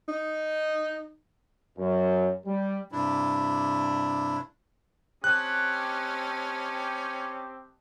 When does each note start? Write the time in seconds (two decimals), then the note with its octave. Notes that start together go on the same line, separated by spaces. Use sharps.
0.08 D#4
1.77 F#2
2.45 G3
2.92 G2 C3 D4 E4
5.24 C4 C#4 G4 D#5 A5 F#6